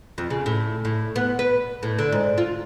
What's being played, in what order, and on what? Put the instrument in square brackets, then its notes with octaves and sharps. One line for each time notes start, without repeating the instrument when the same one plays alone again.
[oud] F2
C#3
A2
A2
B3
B4
A2
D3
G#2
F4